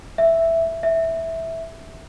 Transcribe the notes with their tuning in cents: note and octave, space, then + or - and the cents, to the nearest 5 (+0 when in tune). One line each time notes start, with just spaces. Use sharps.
E5 +5
E5 -5